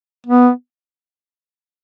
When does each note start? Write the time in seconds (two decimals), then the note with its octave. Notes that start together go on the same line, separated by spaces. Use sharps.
0.26 B3